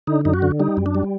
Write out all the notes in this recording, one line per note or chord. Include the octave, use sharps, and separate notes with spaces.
D3 D#4
F#2 D#4
F#4
D3
G3 D#4
F#2
D4
G3